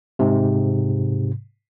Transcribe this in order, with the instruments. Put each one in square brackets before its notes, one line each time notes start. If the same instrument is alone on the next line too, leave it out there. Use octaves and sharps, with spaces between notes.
[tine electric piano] G#2 C3